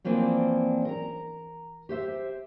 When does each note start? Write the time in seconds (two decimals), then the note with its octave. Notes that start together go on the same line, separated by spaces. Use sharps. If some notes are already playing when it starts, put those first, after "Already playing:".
0.05 E3 F3 A#3 C4 D4
0.85 A#4 A#5
1.89 G4 C5 E5